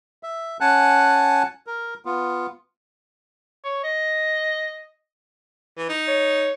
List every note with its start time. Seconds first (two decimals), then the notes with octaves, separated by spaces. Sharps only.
0.23 E5
0.60 C#4 F#5 G#5 A5 F#6
1.67 A#4
2.05 B3 F4
3.64 C#5
3.84 D#5
5.77 E3
5.89 D#4
6.08 C#5